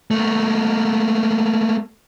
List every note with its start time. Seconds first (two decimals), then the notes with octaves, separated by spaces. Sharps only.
0.11 A3 A#3